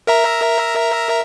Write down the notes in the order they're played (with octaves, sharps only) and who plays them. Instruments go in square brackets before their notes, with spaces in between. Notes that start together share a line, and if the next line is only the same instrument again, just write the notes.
[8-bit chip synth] A#4 E5 A#5